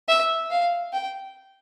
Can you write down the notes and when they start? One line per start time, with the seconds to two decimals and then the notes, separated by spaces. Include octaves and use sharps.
0.08 E5
0.51 F5
0.93 G5